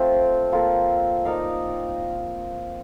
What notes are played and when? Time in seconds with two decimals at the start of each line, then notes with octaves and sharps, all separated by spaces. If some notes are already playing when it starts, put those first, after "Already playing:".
Already playing: A3 C4 F4
0.52 A#3 F4 A4
1.25 D#4 A#4 D5 F5